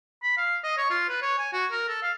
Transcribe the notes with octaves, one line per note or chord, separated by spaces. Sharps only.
B5
F5
D#5
C#5
F4
B4
C#5
G#5
F#4
A#4
A4
F5